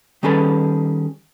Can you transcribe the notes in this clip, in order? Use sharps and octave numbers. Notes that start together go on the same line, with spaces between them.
D#3 G3 C#4 G#4 A4 B4